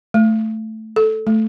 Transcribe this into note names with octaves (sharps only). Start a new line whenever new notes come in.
A3
A4
A3